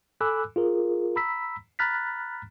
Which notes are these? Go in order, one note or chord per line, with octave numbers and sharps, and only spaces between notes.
A4 G#5 B5 D6 E6 F#6
F4 G#4 A#4
A#5 B5 E6 B6
A#5 B5 F6 F#6 A6 B6